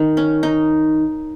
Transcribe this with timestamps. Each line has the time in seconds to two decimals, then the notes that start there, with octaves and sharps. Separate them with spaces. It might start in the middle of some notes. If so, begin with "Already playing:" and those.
Already playing: D#3 D#4
0.17 C#4
0.43 D#4